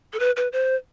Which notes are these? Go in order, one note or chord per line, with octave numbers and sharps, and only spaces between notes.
A4
B4
B4
C5